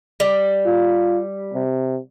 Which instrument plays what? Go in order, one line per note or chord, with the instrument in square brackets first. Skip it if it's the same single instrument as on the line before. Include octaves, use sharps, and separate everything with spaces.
[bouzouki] G3
[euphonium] F4
C3